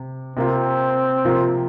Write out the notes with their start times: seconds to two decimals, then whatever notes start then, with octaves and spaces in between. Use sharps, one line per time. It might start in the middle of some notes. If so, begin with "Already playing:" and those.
Already playing: C3
0.36 C3 A#3 C4 F4
1.25 C3 F3 A#3 F4